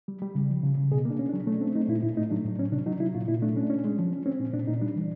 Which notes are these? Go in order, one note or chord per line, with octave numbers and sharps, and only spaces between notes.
G3
G3
C#3
F3
C#3
C#3
B2 G#4
A#3
D4
C#4
D4
F#3
A3 C#4
C4 D4
A3 D#4
A#2 E4
A2 E4
A3 D#4
F#3 D4
A2
F#3 C#4
C3 D4
F#3 D#4
F#3 E4
A#2 F4
A#2 E4
A3 D4
C#4 D4
C#4
G#3
F3
C#4
C4 C#4
A#2 C#4
A#2 D4
A#2 D#4
G3 D4
E3